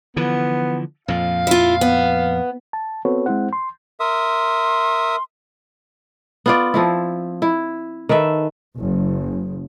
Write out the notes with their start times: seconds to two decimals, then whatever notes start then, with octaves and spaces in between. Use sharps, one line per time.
0.16 D3 E3 F3 B3
1.08 F2 A#2 F3 F5
1.47 E4 F4
1.81 B3
2.73 A5
3.05 B3 C4 F#4 A4 B4 C#5
3.26 G#3 C4 E4 C5 F#5
3.53 C6
4.00 A#4 E5 C6 D#6
6.46 B3 F4 D5
6.74 F3 C4 E4
7.42 E4
8.09 D#3 A4 B4 E5
8.77 F#1